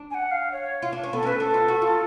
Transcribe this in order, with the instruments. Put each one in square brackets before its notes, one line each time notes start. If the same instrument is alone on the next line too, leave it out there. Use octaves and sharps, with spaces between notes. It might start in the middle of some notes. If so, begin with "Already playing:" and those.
Already playing: [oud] D4
[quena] G#5
F#5
F5
C#5
[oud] F4
D4
C#4
[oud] B3 [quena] A4
[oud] C#4
[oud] D4 [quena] B4
[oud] D4 [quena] A4
[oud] F4
F#4
F4